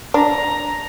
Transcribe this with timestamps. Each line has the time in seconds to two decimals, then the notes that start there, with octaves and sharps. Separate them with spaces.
0.14 D4 A#5